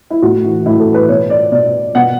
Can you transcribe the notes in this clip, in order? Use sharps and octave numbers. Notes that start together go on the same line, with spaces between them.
E4
A2 F#4
E3
A2 E4
A4
E3
B4
B2 C#5
D5
B2 D5
B2 F#5